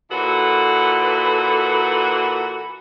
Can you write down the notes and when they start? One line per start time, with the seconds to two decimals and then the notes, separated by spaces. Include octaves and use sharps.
0.11 A#2 E3 F#4 A4 B4